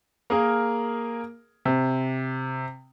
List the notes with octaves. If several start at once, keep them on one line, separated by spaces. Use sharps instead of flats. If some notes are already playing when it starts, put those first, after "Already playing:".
A#3 G#4 A#4
C3